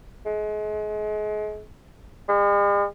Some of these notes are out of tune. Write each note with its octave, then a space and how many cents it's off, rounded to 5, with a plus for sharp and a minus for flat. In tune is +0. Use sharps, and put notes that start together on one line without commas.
G#3 +35
G#3 -45